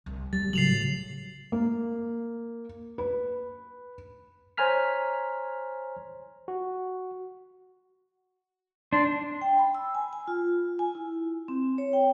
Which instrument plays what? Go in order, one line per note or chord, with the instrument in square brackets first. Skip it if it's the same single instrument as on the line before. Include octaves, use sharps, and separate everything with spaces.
[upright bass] C2 C3
[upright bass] F2 B3 [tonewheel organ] G3 [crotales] A6
[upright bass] A2 C#3 [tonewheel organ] F#3 [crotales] C7 F7 F#7
[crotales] C7
[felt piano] A#3
B4
[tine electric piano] C5 C#5 G#5 A#5 F6 B6
F#4
[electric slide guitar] D4 [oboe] C6
[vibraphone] G5
B5
E6
G#5
G#5
F4
G#5
E4
C4
C#5
G5